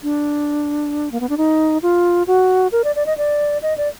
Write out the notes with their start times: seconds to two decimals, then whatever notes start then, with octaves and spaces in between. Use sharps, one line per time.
0.03 D4
1.12 A#3
1.20 B3
1.29 D4
1.38 D#4
1.83 F4
2.27 F#4
2.72 A#4
2.84 D5
2.96 D5
3.06 D#5
3.17 D5
3.62 D#5
3.78 D5